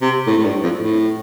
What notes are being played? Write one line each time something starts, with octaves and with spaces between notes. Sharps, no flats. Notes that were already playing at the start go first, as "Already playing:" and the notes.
C3
A2
A2
G2
F2
A2